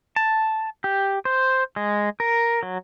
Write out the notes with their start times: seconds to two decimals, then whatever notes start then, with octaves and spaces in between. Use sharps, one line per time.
0.16 A5
0.84 G4
1.25 C5
1.76 G#3
2.20 A#4
2.63 F#3